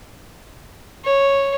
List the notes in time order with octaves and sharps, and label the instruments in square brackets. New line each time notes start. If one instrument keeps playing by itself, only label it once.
[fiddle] C#5